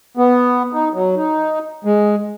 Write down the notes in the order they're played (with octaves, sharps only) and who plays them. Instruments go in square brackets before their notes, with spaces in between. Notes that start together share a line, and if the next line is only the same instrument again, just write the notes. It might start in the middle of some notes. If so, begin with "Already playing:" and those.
[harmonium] B3
D#4
F#3
D#4
G#3